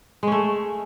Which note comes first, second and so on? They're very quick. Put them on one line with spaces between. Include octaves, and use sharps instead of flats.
G#3 C#4 A3